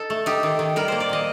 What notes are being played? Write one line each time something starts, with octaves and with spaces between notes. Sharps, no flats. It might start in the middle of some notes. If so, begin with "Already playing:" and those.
Already playing: D#4 A4
A3
D#4 G4
D#3
D#3
G3 A#4
A#3 C5
D5
A#2 D#5